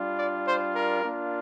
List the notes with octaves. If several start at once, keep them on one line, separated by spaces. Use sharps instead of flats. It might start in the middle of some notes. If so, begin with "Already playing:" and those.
Already playing: G3 D4 F4
D5
C5
A#4
A#3 D4 F4